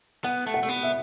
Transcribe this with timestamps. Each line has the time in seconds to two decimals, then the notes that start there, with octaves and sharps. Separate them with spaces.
0.24 B3 F#5
0.47 A3
0.54 F#5
0.63 A3
0.69 B3
0.83 E5